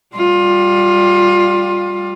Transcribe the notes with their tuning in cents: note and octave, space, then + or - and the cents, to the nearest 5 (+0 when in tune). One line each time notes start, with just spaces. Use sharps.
G3 +0 F4 +20